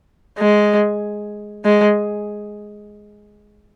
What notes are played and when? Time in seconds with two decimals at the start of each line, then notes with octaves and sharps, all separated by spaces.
0.38 G#3
1.65 G#3